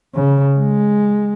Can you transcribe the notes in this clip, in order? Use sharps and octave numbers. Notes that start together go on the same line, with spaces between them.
C#3
G#3